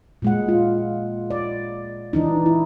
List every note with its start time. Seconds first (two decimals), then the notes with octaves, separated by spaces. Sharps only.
0.22 A#2 G#3 F#5
0.49 F4
1.30 D5
2.13 E3 D4 D#4
2.46 E4